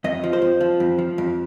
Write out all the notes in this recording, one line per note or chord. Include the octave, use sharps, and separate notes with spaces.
F2 D#5
F3
C5
F2
F3
F2
F3
F2